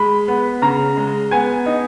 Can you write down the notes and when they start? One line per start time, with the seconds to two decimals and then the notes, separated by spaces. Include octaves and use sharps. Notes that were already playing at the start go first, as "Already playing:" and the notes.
Already playing: G#3 B5
0.28 B3
0.62 C#3 A#5
0.97 G#3
1.31 B3 G#5
1.66 D#4